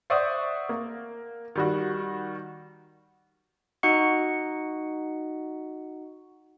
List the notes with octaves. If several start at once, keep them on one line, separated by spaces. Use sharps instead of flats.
C5 D5 E5 F#5 C#6 D#6
A#3
D#3 G3 F#4
D#4 F#4 D#5 F#5 C#6 C#7